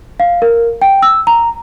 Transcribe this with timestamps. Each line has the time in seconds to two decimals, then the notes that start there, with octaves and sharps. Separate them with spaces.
0.20 F5
0.42 A#4
0.82 G5
1.02 E6
1.27 A#5